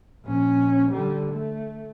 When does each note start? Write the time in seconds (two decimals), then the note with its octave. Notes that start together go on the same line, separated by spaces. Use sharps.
0.25 A#1 C#4
0.92 D3 G3
1.33 A3